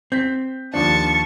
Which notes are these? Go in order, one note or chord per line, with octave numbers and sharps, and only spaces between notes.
C4 G6 B6
D#2 F3 D4 A5 C#6